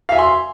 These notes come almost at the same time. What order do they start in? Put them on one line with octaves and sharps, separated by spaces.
F5 E5 G#5 C6